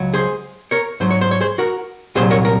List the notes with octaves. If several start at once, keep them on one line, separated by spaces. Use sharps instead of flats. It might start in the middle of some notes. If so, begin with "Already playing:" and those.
Already playing: C#2 F#3
G#4 C5
A#4 C#5
G#2 F#3 C5
C#5
C5
C#5
G#4 C5
F#4 A#4
C2 A#2 F#3 G#4 C5
A#4 C#5
A#4